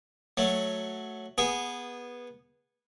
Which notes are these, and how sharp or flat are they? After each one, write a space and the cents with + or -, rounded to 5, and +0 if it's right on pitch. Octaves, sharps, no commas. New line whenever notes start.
F#3 +0 A3 +0
B3 -15 G#4 -15